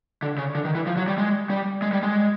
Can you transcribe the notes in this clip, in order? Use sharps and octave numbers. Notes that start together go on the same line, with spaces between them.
D3
C#3
D3
D#3
E3
F3
F#3
G3
G#3
G3
G#3
G3
G#3